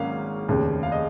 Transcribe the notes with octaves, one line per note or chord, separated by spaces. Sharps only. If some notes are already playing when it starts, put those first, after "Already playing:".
Already playing: G#1 G#2 F#3 A#3 C#4 F5
F1 D#2 C#3
F5
D#5